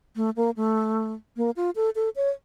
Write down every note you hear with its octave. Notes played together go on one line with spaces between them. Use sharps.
A3
A#3
A3
A#3
F4
A4
A4
C#5